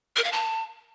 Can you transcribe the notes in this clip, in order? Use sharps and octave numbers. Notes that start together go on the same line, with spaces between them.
A#4
F5
A5